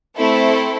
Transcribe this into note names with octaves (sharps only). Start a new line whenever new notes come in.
A3 C4 E4 A4